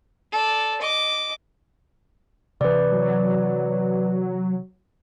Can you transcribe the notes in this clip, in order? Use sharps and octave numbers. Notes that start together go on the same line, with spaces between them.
A4 D5
D#5 D6
C3 E3 B4 D5
F#3